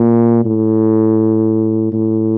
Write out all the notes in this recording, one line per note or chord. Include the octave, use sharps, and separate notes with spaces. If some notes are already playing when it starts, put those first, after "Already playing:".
Already playing: A#2
A2
A2